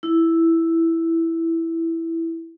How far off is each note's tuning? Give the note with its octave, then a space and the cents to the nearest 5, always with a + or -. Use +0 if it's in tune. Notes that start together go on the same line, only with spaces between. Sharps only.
E4 +0